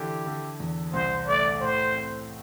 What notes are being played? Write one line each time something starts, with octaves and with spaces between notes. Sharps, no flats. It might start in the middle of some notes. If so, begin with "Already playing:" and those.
Already playing: D3 E3 E4 G4
D3
E2
C2 C5
A3 D5
A2 C5
C4